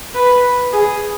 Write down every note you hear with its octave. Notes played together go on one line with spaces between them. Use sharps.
B4
G#4